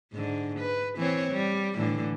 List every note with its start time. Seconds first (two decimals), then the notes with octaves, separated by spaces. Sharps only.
0.13 G#2 D3
0.60 B4
0.96 E3 C4 C#5
1.32 G3
1.75 A2 D3 E3